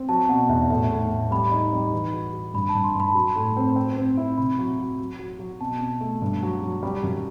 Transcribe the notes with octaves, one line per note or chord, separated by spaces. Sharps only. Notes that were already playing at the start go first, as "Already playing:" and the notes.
Already playing: C4
F#3 A5
B2 F#5
E2 E5
A2 E5
A2
A2
G3 B5
D#4
G3
E3
F#4
F#4
G2 B5
A5
G2
C6
G2 B5
A5
F#3 B5
A2
C4
C4
C4
E4
C3 B5
F#3
F#3
F#3
F#3
F#3
B2 A5
B2
A3
G2
F#3
F#3
G3
F#2